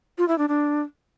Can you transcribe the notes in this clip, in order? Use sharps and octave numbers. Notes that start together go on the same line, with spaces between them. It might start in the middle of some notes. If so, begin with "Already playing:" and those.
F4
E4
D4
D4